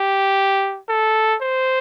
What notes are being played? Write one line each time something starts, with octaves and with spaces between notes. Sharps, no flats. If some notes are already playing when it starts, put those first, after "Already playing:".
Already playing: G4
A4
C5